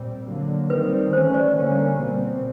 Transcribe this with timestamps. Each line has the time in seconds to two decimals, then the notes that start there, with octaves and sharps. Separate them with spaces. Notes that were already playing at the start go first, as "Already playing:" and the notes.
Already playing: A#2 G3 C4
0.28 D3 F#3 A#3
0.70 D#3 G3 C4 B4
1.13 E3 A3 C#4 C5
1.34 C5 D5
1.55 D3 G3 A#3 C#4
1.98 B2 G3 C4